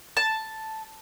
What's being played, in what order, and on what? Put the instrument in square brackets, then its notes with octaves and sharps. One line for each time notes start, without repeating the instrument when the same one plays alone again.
[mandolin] A5